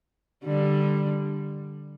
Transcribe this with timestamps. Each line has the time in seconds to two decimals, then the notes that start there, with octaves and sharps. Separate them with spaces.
0.45 D3 G3